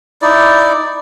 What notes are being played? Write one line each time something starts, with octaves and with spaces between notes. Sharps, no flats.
D#4 E4 D5